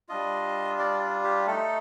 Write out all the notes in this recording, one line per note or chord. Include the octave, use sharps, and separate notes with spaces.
G3 D4 F4 D#5
D5
G4
A3 D#4 A4